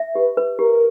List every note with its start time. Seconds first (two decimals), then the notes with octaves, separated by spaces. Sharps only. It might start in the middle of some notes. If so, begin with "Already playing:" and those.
Already playing: E5
0.15 G4 B4
0.37 B4
0.59 G4 A#4